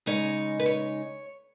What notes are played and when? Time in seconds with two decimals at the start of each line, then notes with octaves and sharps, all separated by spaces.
0.06 C#3 G#3 D#4 C#5
0.60 B4
0.66 C#5